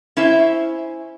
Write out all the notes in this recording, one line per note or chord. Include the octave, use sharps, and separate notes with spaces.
C#4 E4 C5 E5